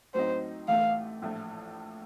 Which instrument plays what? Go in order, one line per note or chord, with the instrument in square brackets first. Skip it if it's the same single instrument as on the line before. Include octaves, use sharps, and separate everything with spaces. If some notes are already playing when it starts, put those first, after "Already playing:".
[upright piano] A2 F#3 C4 D#4 [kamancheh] C5
[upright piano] A1 A2 A3 [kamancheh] F5
[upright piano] A#1 A2 A3